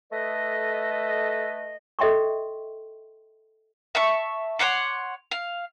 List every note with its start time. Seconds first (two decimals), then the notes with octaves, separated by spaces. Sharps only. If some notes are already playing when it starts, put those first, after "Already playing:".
0.12 A3 A4 B4 D#5
1.99 A4 D#5 E5 G5 C6 C#6
3.95 E5 A5 C#6
4.59 C#5 F#5 C6 D6
5.31 F5